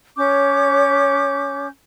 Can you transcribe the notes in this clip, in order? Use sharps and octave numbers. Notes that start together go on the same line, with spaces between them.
C#4 C#5 D6 G6